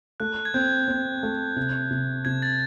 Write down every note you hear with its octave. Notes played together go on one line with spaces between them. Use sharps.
A3 F#6
G#6
C4 G6
C4
A3
C3
C3
C3 G#6
A6